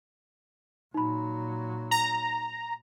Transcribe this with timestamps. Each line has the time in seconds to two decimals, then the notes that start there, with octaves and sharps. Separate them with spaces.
0.94 A#2 F#3 D#4 B5
1.91 A#5